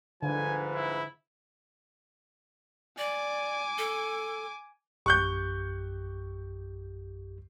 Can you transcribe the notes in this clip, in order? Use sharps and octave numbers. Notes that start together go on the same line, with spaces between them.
G#2 D3 F3 B4 G#5
E4
D5 G#5 D6
A4
A#1 F#2 G4 C#6 F#6 G6